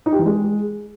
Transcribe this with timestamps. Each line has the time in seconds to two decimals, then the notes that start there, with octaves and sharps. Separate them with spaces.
0.06 D#4
0.13 G4
0.19 E3
0.26 G#3